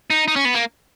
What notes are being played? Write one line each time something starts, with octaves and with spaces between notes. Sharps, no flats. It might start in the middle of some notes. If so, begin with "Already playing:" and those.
D#4
D#4
C#4
B3
A#3